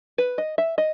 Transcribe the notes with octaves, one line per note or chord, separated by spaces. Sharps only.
B4
D#5
E5
D#5